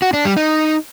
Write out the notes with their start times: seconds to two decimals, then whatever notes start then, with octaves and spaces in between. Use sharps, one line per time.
0.02 F#4
0.14 D4
0.25 G3
0.37 D#4